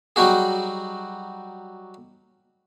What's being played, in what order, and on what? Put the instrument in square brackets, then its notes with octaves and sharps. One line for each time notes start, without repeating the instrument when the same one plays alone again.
[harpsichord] F#3 G3 D#4 F#4 G#4